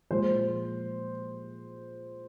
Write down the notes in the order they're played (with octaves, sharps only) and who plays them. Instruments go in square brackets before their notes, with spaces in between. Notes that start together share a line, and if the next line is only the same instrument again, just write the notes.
[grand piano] A#2 F3 G#3 C5